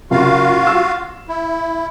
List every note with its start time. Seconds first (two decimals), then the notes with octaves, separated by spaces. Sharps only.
0.11 F#1 F4 F#4 F5
0.67 E6
1.28 E4